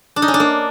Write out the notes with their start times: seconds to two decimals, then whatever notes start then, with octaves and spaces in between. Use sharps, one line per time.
0.16 D4
0.22 D#4
0.28 C#4
0.34 D4
0.40 A#3